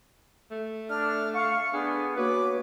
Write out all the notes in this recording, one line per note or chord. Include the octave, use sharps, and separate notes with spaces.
A3
D4 F6
F5 C#6
B3 D4 G#4
A#3 F#4 B4 C#5 D6